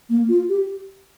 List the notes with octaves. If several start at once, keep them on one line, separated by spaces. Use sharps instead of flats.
A#3
F4
G4